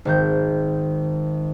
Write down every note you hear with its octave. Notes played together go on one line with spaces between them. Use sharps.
G#1 D#3 G6